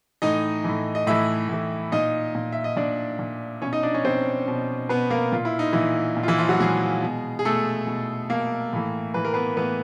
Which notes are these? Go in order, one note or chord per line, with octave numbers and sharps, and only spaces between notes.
A2 E3 D#4 D#5
A2 E3
D#5
A2 E3 E4 E5
A2 E3
A#2 D#4 D#5
A#2
E5
D#5
A#2 D4 D5
A#2
B2 C#4 C#5
D#4 D#5
D4 D5
C#4 C#5
B2 C4 C5
B2
B2 B3 B4
A#3 A#4
A#2 F4
E4
D#4
A#2 E3 E4
A#2
F4
E3 E4
F3 F4
F#3 F#4
A#2 G#3 G#4
B2
G#4
B2 A3 A4
B2
B2 A#3 A#4
A2 E3
A2 E3 B4
A#4
B3 B4
A2 E3 B3 B4